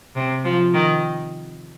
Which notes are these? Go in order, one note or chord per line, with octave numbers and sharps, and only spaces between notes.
C3
F3
D#3